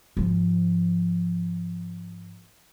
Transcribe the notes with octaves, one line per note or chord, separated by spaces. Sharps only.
G#2 F3